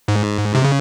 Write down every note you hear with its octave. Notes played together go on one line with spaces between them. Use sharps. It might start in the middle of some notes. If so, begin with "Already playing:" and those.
G#2
C3
C#3